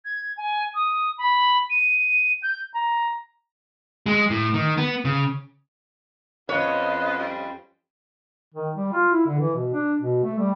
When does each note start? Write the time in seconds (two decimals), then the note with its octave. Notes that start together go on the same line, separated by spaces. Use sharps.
0.05 G#6
0.37 G#5
0.75 D#6
1.18 B5
1.70 D#7
2.43 G6
2.75 A#5
4.06 G#3
4.30 A2
4.54 D#3
4.77 B3
5.05 C#3
6.49 F2 B3 C#4 F4 C5 C#5 D#5
7.19 G3
8.54 D#3
8.76 G3
8.93 F4
9.12 E4
9.26 D3
9.40 E3
9.55 B2
9.73 D4
10.01 B2
10.24 A3
10.39 G3